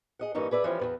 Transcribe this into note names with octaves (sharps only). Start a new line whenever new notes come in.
G#4 D#5 F#5
G2 E3 A#3 C#4 D#4
G#4 B4 D5 E5
E3 F3 G3 C#4
E2 C3 B4